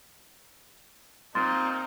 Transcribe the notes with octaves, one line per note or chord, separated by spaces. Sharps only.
A#2 C4 D#4 C6 A6